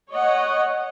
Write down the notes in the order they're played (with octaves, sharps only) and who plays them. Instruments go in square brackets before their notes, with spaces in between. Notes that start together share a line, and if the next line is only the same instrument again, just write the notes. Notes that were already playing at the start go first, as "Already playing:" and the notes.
[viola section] C#5 D#5 F#5